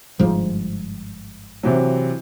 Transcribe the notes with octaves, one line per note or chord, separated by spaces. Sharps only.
G1 G#2 F3
C3 E3 F#3